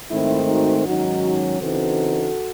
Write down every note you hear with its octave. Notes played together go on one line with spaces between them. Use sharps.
G#2 D#3 A3 C4 E4
D#4 F#4
G#2 D#3 F#3 C#4 D#4 F#4
C#3 E3 C4 D#4 F#4 A4